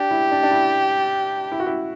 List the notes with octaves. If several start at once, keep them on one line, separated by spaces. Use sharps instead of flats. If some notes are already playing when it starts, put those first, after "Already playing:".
Already playing: D4 G4
E4
D4
D4
E4
E4
F#4
E4